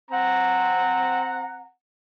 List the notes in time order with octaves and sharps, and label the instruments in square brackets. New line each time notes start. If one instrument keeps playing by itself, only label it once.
[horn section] C4 F#5 A#5